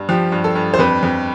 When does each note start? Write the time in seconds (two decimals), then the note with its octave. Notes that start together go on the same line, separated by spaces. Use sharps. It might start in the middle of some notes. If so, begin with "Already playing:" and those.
Already playing: G2
0.09 F3 G4
0.32 G2
0.44 A4
0.56 G2
0.74 C5
0.79 F2 B4
1.03 F2